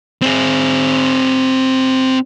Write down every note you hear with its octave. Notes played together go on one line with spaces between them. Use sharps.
C4 G#4